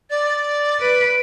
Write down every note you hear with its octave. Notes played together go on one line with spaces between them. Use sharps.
D5 A6
B4 D7